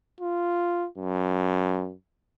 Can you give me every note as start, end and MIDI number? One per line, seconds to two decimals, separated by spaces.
0.20 0.87 65
0.98 1.94 42